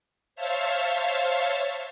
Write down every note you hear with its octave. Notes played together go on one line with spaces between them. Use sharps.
C5 C#5 E5 F5 A5